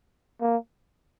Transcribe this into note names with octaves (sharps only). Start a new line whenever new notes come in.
A#3